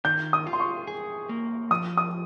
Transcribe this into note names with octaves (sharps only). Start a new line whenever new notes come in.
D#3 G6
D#6
F4
C6
C#6
G#4
A#3
F3 D#6
D#6